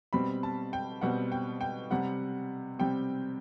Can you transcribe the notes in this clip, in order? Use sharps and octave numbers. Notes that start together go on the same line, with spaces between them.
B2 G3 C4 B5
A5
G5
B2 G3 C4 F#5
G5
G5
C3 G3 C4 F#5
C3 G3 C4 G5